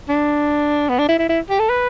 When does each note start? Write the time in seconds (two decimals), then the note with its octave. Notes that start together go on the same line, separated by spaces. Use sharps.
0.09 D4
0.89 B3
0.98 D4
1.08 E4
1.19 E4
1.29 E4
1.50 G4
1.59 A4
1.69 B4